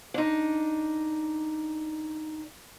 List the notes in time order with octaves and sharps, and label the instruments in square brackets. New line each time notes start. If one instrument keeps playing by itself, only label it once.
[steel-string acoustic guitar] D4 D#4